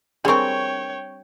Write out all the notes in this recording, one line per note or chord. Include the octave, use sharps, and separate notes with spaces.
G3 C4 D4 G#4 A#4 C#5 G5 C#6